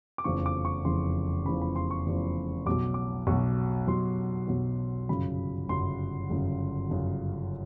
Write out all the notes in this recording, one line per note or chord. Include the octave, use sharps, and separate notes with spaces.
D6
F1 E2 C#3 F3 C#6
D6
C#6
F1 E2 C#3 F3 C6
F1 E2 C#3 F3 B5
B5
C6
C#6
F1 E2 C#3 F3
B1 B2 F#3 D6
D6
B1 B2 F#3 C#6
B1 B2 F#3 C6
B1 B2 F#3
G1 F#2 C#3 B5
G1 F#2 C#3 C6
G1 F#2 C#3
G1 F#2 C#3